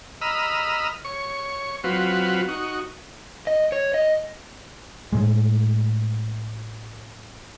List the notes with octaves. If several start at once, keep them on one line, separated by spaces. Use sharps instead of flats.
D#5 A#5 B5 E6 F6
C#5 C#6
F#3 C4 F4 F#4 B4
D#4 F#4 C#6
D#5
C#5
D#5
A2 G#3